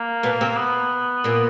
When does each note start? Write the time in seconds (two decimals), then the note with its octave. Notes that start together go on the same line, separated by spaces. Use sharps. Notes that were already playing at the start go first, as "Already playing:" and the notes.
Already playing: A#3
0.23 B2 B3
0.41 C3 C4
0.57 B3
1.24 A#2 A#3